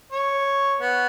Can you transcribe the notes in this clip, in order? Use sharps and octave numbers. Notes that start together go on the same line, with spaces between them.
C#5
B3